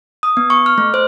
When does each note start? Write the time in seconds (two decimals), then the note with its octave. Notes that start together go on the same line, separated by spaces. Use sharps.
0.23 D#6
0.37 B3
0.50 C#6
0.66 F6
0.78 A3
0.94 C5